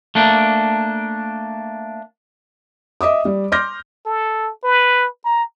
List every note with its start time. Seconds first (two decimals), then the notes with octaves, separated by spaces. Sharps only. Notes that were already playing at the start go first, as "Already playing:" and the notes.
0.15 A3 A#3 D4
3.01 D#5 E5 D6 D#6
3.25 G3
3.52 C6 D6 F6 G6 A#6
4.06 A4
4.64 B4
5.25 A#5